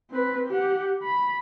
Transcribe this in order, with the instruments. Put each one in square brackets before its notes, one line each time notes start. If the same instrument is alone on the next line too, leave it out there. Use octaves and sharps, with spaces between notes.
[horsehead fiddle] C4 B4
G4 F#5
B5